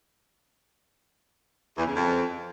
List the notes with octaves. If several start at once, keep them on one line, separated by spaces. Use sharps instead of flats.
E2
C#3
F2